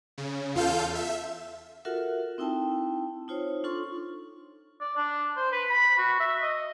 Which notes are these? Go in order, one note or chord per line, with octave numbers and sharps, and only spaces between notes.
C#3
E2 F4 A4 F5 G6
E5
F4 F#4 A4 A#4 E5 F#5
C4 D#4 E4 G5 A5
D#4 F4 C5 C#5
D4 F4 A4 C6 C#6
D5
D4
C5
B4
B5
F#4
E5
D#5